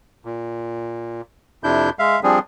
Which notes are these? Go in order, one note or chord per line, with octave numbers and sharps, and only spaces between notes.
A#2
F2 C3 D4 E4 G6
G#3 E5 F5
F3 G3 C4 D4 G#4